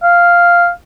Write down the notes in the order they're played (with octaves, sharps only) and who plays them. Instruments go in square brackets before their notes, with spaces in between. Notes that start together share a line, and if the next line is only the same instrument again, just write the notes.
[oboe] F5